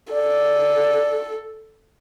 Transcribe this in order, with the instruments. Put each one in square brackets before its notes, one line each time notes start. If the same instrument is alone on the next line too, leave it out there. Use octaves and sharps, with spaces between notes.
[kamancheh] A4 [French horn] D5